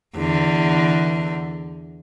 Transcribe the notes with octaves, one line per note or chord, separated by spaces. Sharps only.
E2 D3